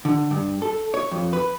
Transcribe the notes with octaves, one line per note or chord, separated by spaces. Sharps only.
D3
G2
A4
C#5
F2
B4